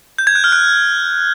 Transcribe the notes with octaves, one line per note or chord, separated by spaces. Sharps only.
G6
G#6
F#6
F6
F#6